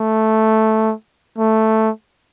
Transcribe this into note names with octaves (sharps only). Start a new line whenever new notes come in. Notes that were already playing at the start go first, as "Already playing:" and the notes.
Already playing: A3
A3